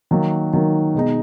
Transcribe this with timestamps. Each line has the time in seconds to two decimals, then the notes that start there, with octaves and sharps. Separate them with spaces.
0.11 D#3 F#3 A#3
0.53 D#3 F#3 A#3
0.94 B2 G#3 D#4